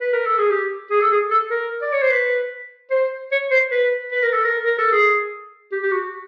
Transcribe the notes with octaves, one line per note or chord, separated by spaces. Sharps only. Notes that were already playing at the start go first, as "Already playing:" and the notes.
B4
A#4
A4
G#4
G4
G#4
A4
G#4
A4
A#4
D5
C#5
C5
B4
C5
C#5
C5
B4
B4
A#4
A4
A#4
A#4
A4
G#4
G4
G4
F#4